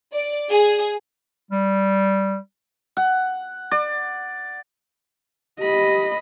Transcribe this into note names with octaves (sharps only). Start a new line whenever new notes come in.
D5
G#4
G3
F#5
D5
G4 D#5 B5